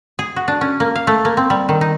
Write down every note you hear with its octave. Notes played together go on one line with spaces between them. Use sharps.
G#4
F#4
D4
C#4
A#3
F5
A3
A#3
C4
G3
D#3
D#4